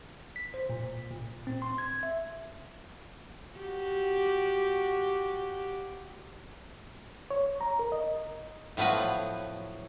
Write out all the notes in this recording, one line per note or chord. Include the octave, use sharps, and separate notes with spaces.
B6
C5
A#2
A#2
C4
C6
G#6
E5
F#4 G4
C#5
A#5
A#4
D#5
A2 F3 F#3 B3 B4